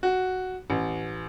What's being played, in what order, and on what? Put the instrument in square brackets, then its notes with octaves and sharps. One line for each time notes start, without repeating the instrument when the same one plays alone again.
[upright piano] F#4
A1